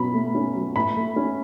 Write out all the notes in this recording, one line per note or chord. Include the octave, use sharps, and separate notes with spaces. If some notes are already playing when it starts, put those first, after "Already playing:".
Already playing: B2 F#3 C#4 B5
A3
C#4
F#3
A2 B5
A3
C#4